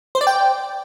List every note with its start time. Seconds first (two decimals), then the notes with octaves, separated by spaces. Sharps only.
0.15 C5
0.21 D5
0.27 G5